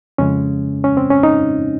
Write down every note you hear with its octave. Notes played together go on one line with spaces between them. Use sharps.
F2 C#3 G#3 C#4
C#4
C4
C#4
D#4